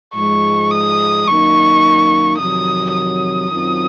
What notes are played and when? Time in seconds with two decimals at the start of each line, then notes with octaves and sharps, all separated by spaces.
0.15 G#2 F3 G#3 C#6
0.71 D#6
1.26 F#2 D#3 A#3 D#4 C#6
2.38 F2 C3 D#3 F#3 D#6
2.94 D#6
3.50 F#2 D#3 F#3 C4 F4